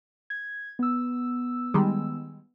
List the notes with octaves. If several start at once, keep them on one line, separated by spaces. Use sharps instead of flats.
G#6
B3 E6
D#3 G3 G#3